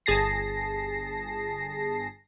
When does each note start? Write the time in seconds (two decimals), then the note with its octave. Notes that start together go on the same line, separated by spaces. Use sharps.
0.06 G1 G#4 A5 A#6 C7